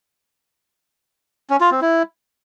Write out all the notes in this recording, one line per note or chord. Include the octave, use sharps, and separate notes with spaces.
C#4
F4
C4
E4